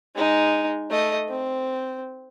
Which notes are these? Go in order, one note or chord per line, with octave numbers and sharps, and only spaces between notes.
G#3 D#4
A3 D#5
C4